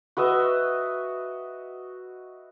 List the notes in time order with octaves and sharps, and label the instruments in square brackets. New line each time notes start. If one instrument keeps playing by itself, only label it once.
[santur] F#4 B4 D#5 E5